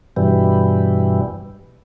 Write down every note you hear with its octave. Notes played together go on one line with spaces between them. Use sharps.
G2 B2 E3 G3